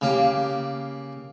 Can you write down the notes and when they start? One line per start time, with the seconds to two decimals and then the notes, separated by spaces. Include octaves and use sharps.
0.01 C#3 A#3 G4